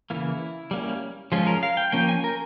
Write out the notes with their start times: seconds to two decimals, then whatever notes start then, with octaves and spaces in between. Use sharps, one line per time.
0.10 C#3 E3 A#3 E4
0.71 G3 A#3 C#4
1.32 F3 G#3 C#4 F4
1.47 A#4
1.63 F5
1.77 G5
1.92 F3 A#3 C#4 G5
2.08 G#5
2.24 A#4